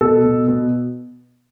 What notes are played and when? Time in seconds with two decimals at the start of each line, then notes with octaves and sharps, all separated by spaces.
0.01 B2 A4
0.24 B2
0.48 B2